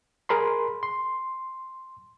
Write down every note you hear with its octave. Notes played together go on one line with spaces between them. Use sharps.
G#4 A#4 B5 C6
C6